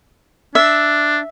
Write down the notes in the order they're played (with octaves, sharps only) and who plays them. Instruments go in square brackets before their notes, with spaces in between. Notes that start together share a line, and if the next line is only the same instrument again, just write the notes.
[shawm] D4 [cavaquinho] E5